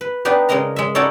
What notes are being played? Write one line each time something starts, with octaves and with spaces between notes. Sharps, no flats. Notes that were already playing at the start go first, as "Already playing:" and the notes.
B4
B3 D4 D#4 G4 B4
C#3 G#3 A#4 D#5 A#5
G#3 E5
C#4 D#4 E4 F#4 A4 D5